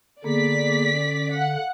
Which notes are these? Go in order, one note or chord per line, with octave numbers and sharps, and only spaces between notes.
D3 A#3 B3 G#4 D5 B6
C#4
F5 F#5